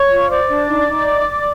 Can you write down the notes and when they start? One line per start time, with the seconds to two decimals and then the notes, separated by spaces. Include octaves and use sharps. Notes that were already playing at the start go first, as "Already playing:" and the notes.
Already playing: C#5 C#6
0.10 F4
0.29 C5 D5 D6
0.49 D4
0.68 D#4
0.87 D#4